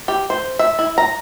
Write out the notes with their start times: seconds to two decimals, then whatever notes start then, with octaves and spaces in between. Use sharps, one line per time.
0.08 G4
0.30 C5
0.59 E5
0.79 E4
0.98 A#5